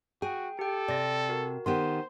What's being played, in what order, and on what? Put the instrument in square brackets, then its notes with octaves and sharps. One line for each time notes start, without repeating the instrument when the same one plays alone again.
[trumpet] F#4 [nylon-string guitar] G#4 [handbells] G5
[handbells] G4 G5 [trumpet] A4
[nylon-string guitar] C3 [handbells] D5 G5 A#6
[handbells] F#4 A#4
[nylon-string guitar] D#3 B3 G4 [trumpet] C5 [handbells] C6